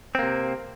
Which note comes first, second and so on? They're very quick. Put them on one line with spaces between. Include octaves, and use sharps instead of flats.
C4 A#3 C3